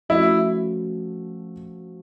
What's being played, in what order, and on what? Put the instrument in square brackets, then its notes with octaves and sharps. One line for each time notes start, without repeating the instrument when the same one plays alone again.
[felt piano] F3 A3 C#4 F#4 [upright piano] E4